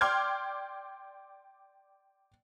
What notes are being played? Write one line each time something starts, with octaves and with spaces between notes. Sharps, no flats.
D5 G5 C6 D6 F6 G#6